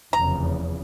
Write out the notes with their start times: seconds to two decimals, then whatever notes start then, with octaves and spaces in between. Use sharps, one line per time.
0.13 F1 E2 C#3 A#5